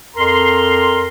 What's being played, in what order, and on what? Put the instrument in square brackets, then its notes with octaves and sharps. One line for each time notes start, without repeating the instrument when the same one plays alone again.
[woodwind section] F2 A#4 A#5 C6